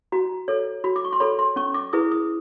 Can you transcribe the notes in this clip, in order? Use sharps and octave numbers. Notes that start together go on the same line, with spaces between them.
F#4 A#5
A4 C#5
F#4 B5
D6
C#6
C6
A4 C#5 B5
C6
C#4 C#6
D6
E4 G#4 B4 D#6
D#6